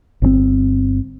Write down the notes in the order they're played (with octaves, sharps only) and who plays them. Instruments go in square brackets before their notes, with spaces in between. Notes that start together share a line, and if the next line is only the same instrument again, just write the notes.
[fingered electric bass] G1 B2 C4